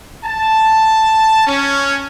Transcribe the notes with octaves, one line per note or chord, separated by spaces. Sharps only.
A5
C#4